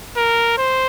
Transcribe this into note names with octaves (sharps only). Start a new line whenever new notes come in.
A#4
C5